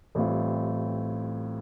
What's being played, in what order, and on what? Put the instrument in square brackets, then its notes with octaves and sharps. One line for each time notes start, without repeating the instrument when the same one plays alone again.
[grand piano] A1 A2 G3 C4 F4